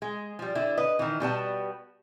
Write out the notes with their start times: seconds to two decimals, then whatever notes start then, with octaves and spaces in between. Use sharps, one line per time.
0.02 G#3
0.39 F3 G3
0.55 D3 E4
0.77 B4 D#5
0.99 D#3 E3
1.20 B2 G3 B3 A5